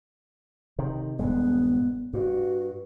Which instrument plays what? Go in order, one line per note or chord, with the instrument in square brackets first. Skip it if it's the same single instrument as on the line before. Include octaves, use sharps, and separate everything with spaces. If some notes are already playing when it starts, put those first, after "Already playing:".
[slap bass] C3 D#3
[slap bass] D#1 G2 G#3 [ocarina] B3
[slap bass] G2 [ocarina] F#4